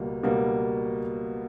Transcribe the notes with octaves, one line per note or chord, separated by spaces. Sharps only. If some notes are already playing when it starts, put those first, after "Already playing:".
Already playing: C#2 B2 G3 A#3
C#2 B2 G3 A#3